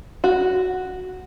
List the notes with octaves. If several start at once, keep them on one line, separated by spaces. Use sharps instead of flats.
F#4